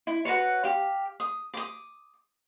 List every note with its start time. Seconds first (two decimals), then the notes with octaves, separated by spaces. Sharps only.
0.07 E4
0.25 F#4 A#4 B4 C#5
0.64 G4 F5
1.20 D#6
1.54 D6 D#6